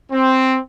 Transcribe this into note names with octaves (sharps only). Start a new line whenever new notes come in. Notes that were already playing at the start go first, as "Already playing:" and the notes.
C4